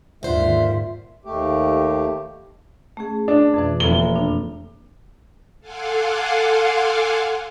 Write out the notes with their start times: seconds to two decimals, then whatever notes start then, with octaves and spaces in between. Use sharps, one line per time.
0.23 D#2 G#2 D3 D#3 F4 C5 E5
1.25 D#2 A3 G4
2.97 A3 C#4 G#4
3.28 D4
3.54 F2 B2 E3
3.80 F1 A#3 A4 G7
4.16 D4
5.60 A4 F5 F#5 G#5 C6 D6